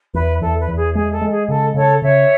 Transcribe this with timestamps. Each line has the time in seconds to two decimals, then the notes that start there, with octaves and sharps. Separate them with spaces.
0.14 E2 B4
0.41 E2 A4
0.59 B4
0.68 E2
0.77 G#4
0.95 G#3 G#4
1.12 A4
1.21 G#3
1.31 G#4
1.48 C#3 A4
1.74 C#3 A4 C#5
2.02 C#3 C#5 E5